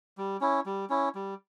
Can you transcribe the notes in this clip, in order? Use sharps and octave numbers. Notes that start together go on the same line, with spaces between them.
G3
C#4 E4
G3
C#4 E4
G3